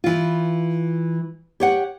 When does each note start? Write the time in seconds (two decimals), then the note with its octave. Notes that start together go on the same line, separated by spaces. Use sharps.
0.04 E3 F4
1.60 G4 C#5 F#5